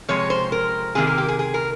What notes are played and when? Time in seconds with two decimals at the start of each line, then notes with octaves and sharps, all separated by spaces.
0.09 C3 F3 G#3 C#5
0.30 C5
0.52 A#4
0.95 C3 D#3 A#3 G#4
1.07 A#4
1.18 G4
1.28 G#4
1.39 G#4
1.54 A#4